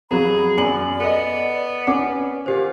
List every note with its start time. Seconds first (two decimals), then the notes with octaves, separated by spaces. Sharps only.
0.11 F2 F#3 G#4 A#5 B5
0.58 F#2 D5 G#5 F#7
1.00 B3 A4 D#5
1.87 C#4 F#5 D6
2.46 A#2 G4 C5